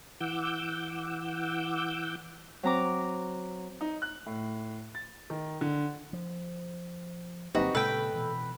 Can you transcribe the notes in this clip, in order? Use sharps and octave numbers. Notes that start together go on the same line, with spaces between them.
E3 F#5 D6 E6 G6
F#3 C4 A#5 D6
D#4
F#6
A2
A6
D#3
D3
F3
G1 F#3 A#3 C4 D#4 F#4 G4 B4
A#2 C#3 G#3 A#3 A4 B4 G5 E6
B2 E3